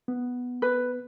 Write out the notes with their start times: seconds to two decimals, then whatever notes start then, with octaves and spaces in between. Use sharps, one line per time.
0.08 B3
0.62 B4